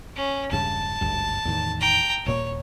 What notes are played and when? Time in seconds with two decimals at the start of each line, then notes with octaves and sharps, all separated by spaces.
0.16 C#4
0.51 E1 G2 C#3 A5
1.01 G#1 D2 G2
1.45 E2 A2 D#3
1.81 G5 A#5
2.26 D#1 A#2 A#3 C#5